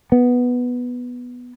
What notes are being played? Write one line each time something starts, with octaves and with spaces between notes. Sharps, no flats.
B3